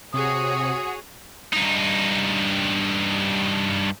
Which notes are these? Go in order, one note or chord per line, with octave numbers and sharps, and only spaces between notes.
C3 F#4 G#4 C#5 D#6
G2 D#4